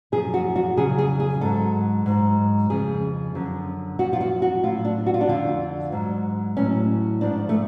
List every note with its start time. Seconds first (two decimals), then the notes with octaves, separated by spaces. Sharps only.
0.12 F#2 F3 G#4
0.34 F#4
0.56 F#4
0.77 F2 C#3 F#3 G#4
0.98 G#4
1.20 G#4
1.41 G#2 F#3 A4
2.06 G#2 F#3
2.70 F2 C#3 F3 G#4
3.35 F#2 D3 F3
3.99 F#2 F#4
4.02 F3
4.13 F4
4.21 F#4
4.42 F#4
4.63 A2 F4
4.67 F#3
4.85 D4
5.06 F#4
5.14 F4
5.21 D4
5.28 F2 D3 F3 F4
5.92 G#2 F#3
6.57 A2 F#3 C#4
7.21 G#2 F3 D4
7.49 A3